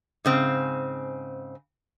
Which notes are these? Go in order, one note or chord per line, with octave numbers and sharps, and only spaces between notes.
G#2 C#3 C4